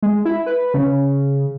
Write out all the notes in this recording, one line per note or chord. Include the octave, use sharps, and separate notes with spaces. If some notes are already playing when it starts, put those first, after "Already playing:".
G#3
E4
B4
C#3